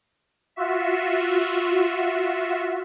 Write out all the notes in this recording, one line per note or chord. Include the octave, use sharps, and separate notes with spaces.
F4 F#4 E5